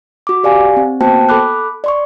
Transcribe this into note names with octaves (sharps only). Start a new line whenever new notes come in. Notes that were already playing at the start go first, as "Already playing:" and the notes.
F#4 D6
G4 D5 F5 G#5
C4
A#3 B3 F#4 C5 G5 A5
A4 B5 D6 F#6
D5 C6 C#6